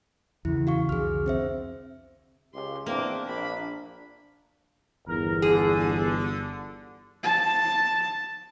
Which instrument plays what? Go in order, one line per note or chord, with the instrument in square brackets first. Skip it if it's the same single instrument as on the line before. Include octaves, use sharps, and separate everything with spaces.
[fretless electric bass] E2 C#3 E3 [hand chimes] E4
[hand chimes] F#4 F5 C#6
[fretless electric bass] C2 F2 D3 [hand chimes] G#4 F6
[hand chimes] C4 C5 E5
[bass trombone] C#2 [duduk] G4 [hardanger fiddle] C6
[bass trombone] E2 [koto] A#3 [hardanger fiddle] C4 D6 [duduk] D4
[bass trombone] A#1 [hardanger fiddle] B5
[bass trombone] G1 [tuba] E2 [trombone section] A#4
[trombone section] D3 [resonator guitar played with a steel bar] G#4
[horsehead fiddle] A5